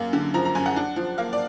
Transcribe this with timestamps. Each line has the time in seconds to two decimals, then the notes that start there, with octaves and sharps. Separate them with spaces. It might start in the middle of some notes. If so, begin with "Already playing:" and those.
Already playing: F#2 A#3
0.13 D3
0.34 F3 A#5
0.45 A#5
0.55 F#2 G#5
0.66 F#5
0.76 D4
0.96 F3
1.18 A#3 F5
1.33 D5